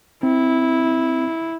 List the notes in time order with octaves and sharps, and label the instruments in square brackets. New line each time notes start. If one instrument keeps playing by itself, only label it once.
[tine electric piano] C4 [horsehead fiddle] E4